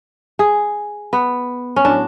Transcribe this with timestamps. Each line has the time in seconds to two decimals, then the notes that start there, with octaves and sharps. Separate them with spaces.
0.39 G#4
1.13 B3
1.76 C#4
1.85 A2 F#3 D4